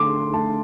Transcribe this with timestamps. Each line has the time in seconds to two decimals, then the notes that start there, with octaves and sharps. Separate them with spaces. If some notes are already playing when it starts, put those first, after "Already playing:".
Already playing: D3 A3 C6 D6
0.33 A3 A5